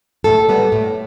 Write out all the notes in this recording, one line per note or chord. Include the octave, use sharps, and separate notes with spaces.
A2 A4
G3 B3
A2